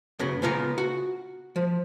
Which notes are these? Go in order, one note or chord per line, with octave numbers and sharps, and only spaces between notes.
F#2 C#3 B3
C#3 B3 F4 E5 A#5
F#4
F3